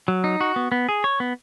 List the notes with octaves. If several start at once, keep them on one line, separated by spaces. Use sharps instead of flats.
F#3
D#4
F#4
B3
B3
G#4
C#5
B3